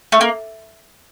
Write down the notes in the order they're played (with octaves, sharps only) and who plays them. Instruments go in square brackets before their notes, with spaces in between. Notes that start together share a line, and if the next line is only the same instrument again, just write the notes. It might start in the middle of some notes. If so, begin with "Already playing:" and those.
[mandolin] A3
A#3